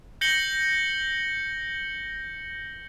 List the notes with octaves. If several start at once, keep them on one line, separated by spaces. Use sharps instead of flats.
G6 A#6 C#7 F#7 G7